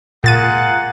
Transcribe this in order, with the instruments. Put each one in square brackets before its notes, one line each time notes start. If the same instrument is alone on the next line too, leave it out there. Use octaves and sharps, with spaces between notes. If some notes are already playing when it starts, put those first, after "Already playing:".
[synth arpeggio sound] A#2 A6 D#7 [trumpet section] G#3 A#3 F#5